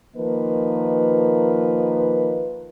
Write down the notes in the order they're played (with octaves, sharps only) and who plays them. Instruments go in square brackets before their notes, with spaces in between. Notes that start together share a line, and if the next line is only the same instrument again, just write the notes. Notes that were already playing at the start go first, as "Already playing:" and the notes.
[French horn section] D#3 F3 A#3 B4 D#5